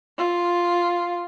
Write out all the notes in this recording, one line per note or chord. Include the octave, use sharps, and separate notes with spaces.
F4